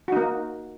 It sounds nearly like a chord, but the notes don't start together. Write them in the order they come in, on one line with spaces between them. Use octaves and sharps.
F#4 D#4 A#3